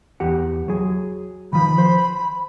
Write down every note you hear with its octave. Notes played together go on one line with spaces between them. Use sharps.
E2 G4 F#5
F#3 G#4
D#3 F3 B5
C5